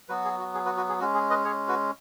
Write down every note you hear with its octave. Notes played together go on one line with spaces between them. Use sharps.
F#3 B3 F#4 B4
G#4
F#4
G#4
F#4 B4
F#4 B4
G#4
G#3 C#4 F#4
G#4
B4 D#5
G#4 C#5
F#4 B4